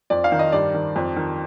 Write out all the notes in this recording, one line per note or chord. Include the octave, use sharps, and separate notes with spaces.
F2 D5
F5
D#3
D#5
G2 D5
D#3
F2
D#3